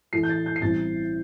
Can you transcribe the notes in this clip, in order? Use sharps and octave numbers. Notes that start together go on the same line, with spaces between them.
A2 E3 A3 E4 C7
G6
A6
G6
C7
A1 G2 E3 C4 E4 A6